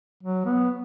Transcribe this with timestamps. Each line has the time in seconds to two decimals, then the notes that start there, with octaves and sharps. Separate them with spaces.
0.23 F#3
0.46 B3